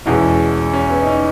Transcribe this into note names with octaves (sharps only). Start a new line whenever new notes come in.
E2 B2 G#3 C#4 E4
C#4
B3
D#4
C#4